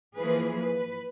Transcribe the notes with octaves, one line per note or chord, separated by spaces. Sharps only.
E3 F3 A#3 G#4 B4
B4